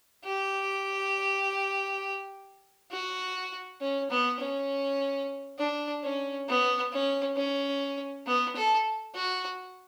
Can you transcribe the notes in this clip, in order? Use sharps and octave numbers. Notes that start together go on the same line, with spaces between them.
G4
F#4
C#4
B3
C#4
D4
C#4
B3
C#4
C#4
B3
A4
F#4